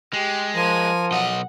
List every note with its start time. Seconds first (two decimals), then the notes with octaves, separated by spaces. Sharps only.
0.13 G#3 G4
0.55 F3 A#4 G#5
1.11 B1 D#5 F#5